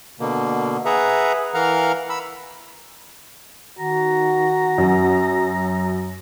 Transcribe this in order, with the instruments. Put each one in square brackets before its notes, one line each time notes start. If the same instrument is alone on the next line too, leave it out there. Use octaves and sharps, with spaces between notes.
[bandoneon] B2 D3 A#3
G#4 B4 E5 F#5 A#5
E3 A#4 F5 F#5 A#5 F6
B5 E6
[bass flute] D#3 [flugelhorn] F#4 [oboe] A#5
[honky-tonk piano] F#2 [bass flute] F#3